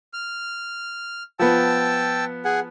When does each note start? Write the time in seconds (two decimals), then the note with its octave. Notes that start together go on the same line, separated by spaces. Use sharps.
0.13 F6
1.39 F3 B3 G5 A5 E6
2.45 G#4 F#5 G#5